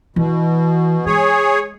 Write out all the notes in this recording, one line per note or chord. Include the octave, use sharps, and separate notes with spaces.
B2 E3
G#3 G#4 C#5